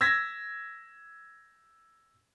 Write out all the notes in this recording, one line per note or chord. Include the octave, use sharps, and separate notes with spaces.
E6 G#6 A#6 B6